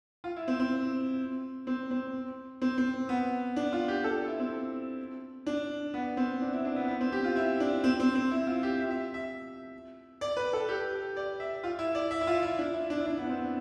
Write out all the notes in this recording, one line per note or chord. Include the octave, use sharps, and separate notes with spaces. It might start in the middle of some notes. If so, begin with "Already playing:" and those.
F4
E4
C4
C4
C4
C4
C4
C4
B3
D4
F4
G4
A4
E4
C4
D4
B3
C4
D4
E4
D4
B3
B3
C4
G4
F4
E4
D4
C4
C4
C4
E4
F4
G4
E5
E5
E5
D5
B4
A4
G4
G4
D5
E5
F4
E4
D5
E5
E4
F4
E4
D4
E4
D4
E4
D4
B3
C4